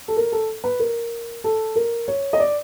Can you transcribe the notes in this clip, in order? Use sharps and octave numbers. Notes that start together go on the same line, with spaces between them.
A4
A#4
A4
B4
A#4
A4
A#4
C#5
D#5
D5